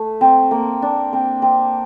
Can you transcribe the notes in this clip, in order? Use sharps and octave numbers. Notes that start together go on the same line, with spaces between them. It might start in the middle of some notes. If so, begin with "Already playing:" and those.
Already playing: A3
C4
A#3
D4
C4
C4